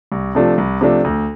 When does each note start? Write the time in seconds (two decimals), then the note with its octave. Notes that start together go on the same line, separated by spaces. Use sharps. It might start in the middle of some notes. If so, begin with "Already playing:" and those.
0.12 C2
0.35 C3 F3 A3 D4
0.58 C2
0.81 C3 F3 A3 D4
1.04 D2